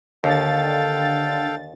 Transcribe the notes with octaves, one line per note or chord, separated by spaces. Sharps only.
D#2 D3 A4 F5 G5 A6